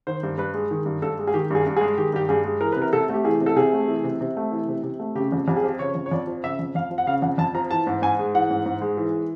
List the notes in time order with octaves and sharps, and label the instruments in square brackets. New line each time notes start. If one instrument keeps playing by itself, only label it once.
[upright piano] D#3 C5
G2
G2 B4
G#3
D#3
G2
G2 A4
G#3
G#4
D#3 G4
G2 G#4
G2
G#4
G#3
D#3 G4
G2 G4
G2 G#4
G#3
E3 A#4
C3 B4
A#4
C3 A4
A3 G4
E3 G#4
C3
A4
C3 G#4
A3
E3
C3
C3
A3
E3
C3
C3
A3
C#3 G4
F2
F2 G4
G#4
F3 G4
C#3 C#5
F2
C#5
F2 D5
F3
C#3 E5
F2
F2 F5
F3
F#5
C#3 F5
F2 F#5
F2 A5
F3 A#5
E3 A5
G#2
G#2 G#5
G#3
E3 F#5
G#2
G#2
G#3
E3